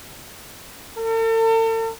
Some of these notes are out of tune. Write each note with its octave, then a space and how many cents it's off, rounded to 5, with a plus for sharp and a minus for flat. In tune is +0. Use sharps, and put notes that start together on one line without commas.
A4 +45